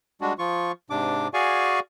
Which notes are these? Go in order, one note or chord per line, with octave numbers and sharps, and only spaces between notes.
G3 G#3 D4 F#4
F3 F4 C#6
G#2 C3 D4 D6
F#4 G#4 D5 F5 G#5 C#6